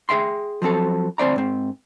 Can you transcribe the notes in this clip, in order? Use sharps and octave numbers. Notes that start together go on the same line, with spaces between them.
G#4 A#4 E5 G5 C6
F3 F#3 C4 A4
D2 C4 C5 D5 A#5
G#2 C4